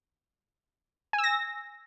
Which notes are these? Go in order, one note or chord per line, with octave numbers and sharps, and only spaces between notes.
G#5
E6
A#6